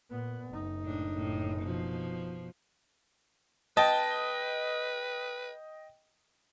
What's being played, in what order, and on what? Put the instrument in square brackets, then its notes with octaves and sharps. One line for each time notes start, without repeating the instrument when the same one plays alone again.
[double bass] A#2 B3
F#1 D#4
[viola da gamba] A2 D4
A2
B2 F3
[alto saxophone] B4 [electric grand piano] D#5 G5 [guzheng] A5